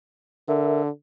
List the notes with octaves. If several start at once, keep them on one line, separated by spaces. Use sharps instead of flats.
D3 A#4 E5